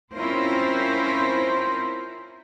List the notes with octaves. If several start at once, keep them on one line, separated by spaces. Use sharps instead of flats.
C4 C#4 E4 F4 A#4 C5